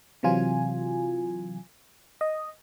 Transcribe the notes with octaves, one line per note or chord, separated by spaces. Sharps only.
C3 E3 F#3 F4 G#5
D#5